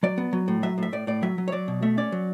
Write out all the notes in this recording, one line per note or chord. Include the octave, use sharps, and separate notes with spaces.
F#3 D5
B3
F#3
A2
F#3 E5
A2 E5
A2 D5
A2 D5
F#3 E5
F#3
C#5
F#3 D5
B2
A3 E5
C#4 D5
F#3